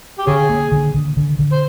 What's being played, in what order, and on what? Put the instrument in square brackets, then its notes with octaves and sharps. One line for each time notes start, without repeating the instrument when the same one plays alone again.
[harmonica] G4
[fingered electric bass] D3 [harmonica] C#4 G#4
[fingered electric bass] A#3
D3
D3
D3
D3
[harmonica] C5